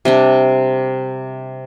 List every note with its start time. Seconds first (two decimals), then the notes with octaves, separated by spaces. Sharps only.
0.05 C3 G3 D4